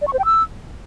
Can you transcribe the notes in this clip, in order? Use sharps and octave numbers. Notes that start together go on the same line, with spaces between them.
D5
C#6
C5
G5
E6